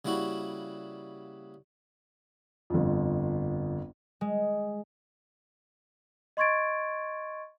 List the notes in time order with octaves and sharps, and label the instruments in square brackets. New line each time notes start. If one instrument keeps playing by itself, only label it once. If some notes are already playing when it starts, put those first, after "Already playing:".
[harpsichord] C#3 G3 A#3 E4 F#4
[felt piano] G1 F2
[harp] G#3
[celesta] D#5 C6 C#6 G#6 A6 D7